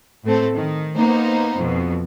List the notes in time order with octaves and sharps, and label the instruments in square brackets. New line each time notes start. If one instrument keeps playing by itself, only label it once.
[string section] A2 A3 C4 A4
D#3
A#3 B3 D#4 C5
F2 B2